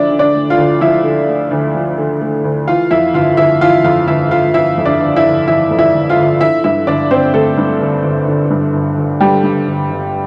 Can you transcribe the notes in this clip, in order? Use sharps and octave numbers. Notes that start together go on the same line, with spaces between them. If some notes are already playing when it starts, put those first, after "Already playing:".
Already playing: D2 F3 D4 E4 D5 E5
D3
D4 D5
A3
F4 F5
D2
F3 E4 E5
D3
A3
D2
F3
D3
A3
D2
E3 F4 F5
F2 E4 E5
G1 F4 F5
G1 E4 E5
E3 F4 F5
F2 F4 F5
G1 E4 E5
G1 F4 F5
E3 E4 E5
F2
D4 D5
G1
E4 E5
G1
E3 E4 E5
F2
E4 E5
G1
F4 F5
G1
D3 E4 E5
G2 E4 E5
G1 D4 D5
G1 C4 C5
D3 A3 A4
G2
G1
G1
D3
G2
G1
G1
D3 G3 G4
G2
G1
G1